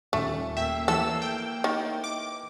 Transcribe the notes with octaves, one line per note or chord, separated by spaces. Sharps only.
D#1 A3 C#4
A#3 E5 G5
E3 A4 E6
G5
D#3
D6